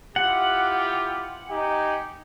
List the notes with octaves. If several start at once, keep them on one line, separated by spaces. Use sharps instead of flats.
E4 F4 G4 F#5
D#4 G4 G#5